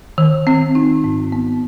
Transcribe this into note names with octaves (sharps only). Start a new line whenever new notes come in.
D#3
C4
D#4
G#2
B3